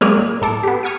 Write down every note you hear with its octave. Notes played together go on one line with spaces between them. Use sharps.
F#3 G#3 A#3 G4 G#4 A#4
A#2
A2 A4 D6
B3 G4
C#6 D#6 F6 G#6 C#7 D7